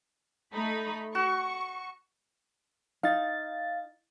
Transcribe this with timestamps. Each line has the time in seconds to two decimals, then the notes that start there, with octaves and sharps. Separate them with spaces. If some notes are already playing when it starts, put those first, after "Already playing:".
0.53 A3 D#4 B5
1.15 F#4 C#6
3.03 D#4 F5 A6